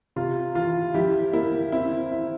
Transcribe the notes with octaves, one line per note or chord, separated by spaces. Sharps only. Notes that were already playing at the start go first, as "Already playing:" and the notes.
C3 F4
E3 F4
F3 E4 G4
A#3 E4
C4 E4
E4